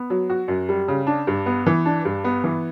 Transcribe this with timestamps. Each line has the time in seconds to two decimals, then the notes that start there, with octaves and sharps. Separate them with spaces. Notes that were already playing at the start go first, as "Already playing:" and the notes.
Already playing: B3
0.10 F#3
0.30 F#4
0.48 F#2
0.69 G3
0.88 C#3
1.07 D4
1.27 G2
1.46 B3
1.66 E3
1.85 D4
2.05 G2
2.24 B3
2.44 E3